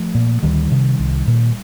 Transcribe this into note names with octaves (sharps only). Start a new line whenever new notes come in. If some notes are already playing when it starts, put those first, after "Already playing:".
Already playing: F3 A3
A#2
D2 D#3 G3
C3
C2
A#2